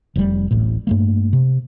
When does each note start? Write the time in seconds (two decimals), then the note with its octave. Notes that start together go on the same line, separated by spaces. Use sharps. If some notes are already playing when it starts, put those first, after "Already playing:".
0.16 F1 C3 G3
0.51 D1 A1 A2
0.87 G2 A3 A#3
1.33 C3